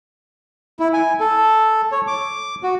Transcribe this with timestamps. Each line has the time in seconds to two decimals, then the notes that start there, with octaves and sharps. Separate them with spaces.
0.80 E4
0.94 G#5
1.20 A4
1.92 C#5
2.07 D6
2.63 F#4